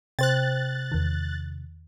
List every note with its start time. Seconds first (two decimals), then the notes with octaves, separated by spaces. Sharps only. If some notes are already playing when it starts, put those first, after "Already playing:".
0.19 C3 C5 G5 F#6 A6
0.92 E2 D#3